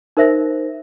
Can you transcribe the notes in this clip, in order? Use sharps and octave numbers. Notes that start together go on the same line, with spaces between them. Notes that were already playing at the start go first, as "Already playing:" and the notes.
D#4 A#4 C5 E5 A#6